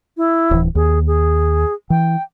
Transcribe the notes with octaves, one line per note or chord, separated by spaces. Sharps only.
E4
D1 E3
D#2 G#4
G#4
E3 G5